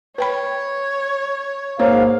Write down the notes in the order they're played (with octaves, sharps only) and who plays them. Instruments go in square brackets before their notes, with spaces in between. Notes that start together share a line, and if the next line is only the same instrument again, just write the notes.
[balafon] B4 G5 B5 [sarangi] C#5
[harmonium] G#2 F5 [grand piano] A#3 [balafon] C5 C#5